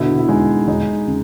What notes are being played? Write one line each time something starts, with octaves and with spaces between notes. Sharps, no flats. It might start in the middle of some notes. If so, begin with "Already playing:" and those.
Already playing: B2 D3 E4
E4
G#3 D#4
G#3 D#4
C#3